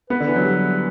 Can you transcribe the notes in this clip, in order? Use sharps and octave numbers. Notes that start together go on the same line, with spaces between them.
B3 B4
D3
E3
F#3
G3